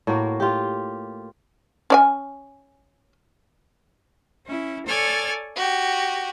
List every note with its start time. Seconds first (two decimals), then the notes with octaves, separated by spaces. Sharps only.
0.07 A2 A#3 F#4 A#4
0.40 F4 G4
1.90 C#4 D5 G#5
4.45 C#4 E4
4.86 A4 C#5 D5 G#5 F6
5.56 F#4 G4